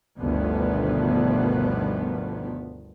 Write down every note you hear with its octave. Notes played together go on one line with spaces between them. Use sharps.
G1 D2 B2 D#3 F3 B3